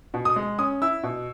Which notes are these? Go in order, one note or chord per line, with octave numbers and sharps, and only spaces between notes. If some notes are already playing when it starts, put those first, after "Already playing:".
B2
D#6
G#3
C#4 D#6
E4 E6
B2